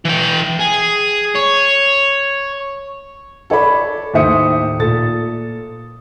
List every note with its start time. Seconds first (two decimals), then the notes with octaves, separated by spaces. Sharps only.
0.05 E3 G5
0.59 G#4
1.35 C#5
3.50 A4 C#5 D5 B5
4.14 D#2 A2 C5 E5 D#6 C#7
4.79 A#2 A4 A6